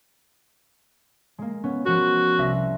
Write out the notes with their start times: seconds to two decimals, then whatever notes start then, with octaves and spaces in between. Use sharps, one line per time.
1.38 G#3 A#3
1.64 B3 C#4
1.85 F3 B3 F#4 A#4
2.38 C2 E5 A#6